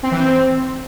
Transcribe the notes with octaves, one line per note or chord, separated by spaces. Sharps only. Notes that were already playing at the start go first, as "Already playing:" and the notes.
C4
E3
C4